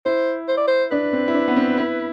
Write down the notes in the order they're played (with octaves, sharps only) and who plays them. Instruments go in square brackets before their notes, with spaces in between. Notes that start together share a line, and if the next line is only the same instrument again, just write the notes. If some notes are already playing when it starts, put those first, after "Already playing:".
[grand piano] E4 [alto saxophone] C5
[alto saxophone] C5
D5
C5
[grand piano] D4 [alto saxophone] B4
[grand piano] C4
E4
D4
B3
C4
E4